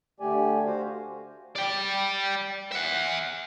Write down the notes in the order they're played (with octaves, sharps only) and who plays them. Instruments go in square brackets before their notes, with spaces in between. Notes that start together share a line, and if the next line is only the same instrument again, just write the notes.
[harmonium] D3 A3 G4 D5 G#5
F#4 C5 F5
[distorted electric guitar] D5 G5
E5 F#5